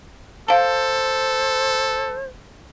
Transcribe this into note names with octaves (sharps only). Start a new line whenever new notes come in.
A4 C5 F5 A5